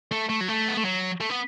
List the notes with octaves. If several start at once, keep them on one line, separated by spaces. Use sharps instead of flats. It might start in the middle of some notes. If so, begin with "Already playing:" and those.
A3
A3
F#3
A3
B3
A3
F#3
A3
B3